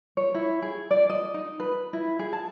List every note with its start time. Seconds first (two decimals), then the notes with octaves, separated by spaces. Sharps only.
0.17 C#5
0.34 E4
0.62 G#4
0.91 D5
1.10 D#5
1.34 D#4
1.60 B4
1.93 E4
2.19 G#4
2.33 A5